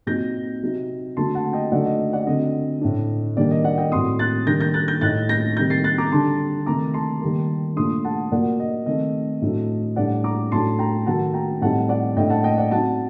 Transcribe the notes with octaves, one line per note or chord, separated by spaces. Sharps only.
A#2 F#3 C4 D#4 G6 A#6
C3 F#3 C4 D#4
D3 F#3 A3 A5 C6
F#5 A5
D#5 G5
D3 F#3 A3 D#4 D5 F#5
D#5
D#5
D5 F#5
D3 F#3 C4 D#5
A2 A3 D4
D#3 G3 A#3 D4 D5
D#5
D5 F#5
D#5 G5
A2 F#3 C4 C6 D#6
F#6 A6
D#3 G3 D4 G6 A#6
G6 A#6
F#6 A6
G6 A#6
A2 A3 D#4 F#6 A6
G6 A#6
D#3 G3 C4 D#4 G6 A#6
A6 C7
F#6 A6
A#5 D6
D3 G3 D4 A5 C6
C3 D#3 A3 A#5 D6
A5 C6
D#3 G3 A#3
A#2 A3 D4 C6 D#6
F#5 A5
A#2 F#3 A#3 D5 F#5
D#5
D#3 A3 C4 D#4 D#5
A2 F#3 A3 D4
A2 G3 D4 D5 F#5
A#5 D6
A2 F#3 A3 D4 A5 C6
G5 A#5
D#3 F#3 A3 F#5 A5
G5 A#5
A2 G3 C4 D#4 F#5 A5
D5 F#5
A2 A3 D4 D#5 G5
F#5 A5
D#5 G5
D5 F#5
F#3 C4 D#4 F#5 A5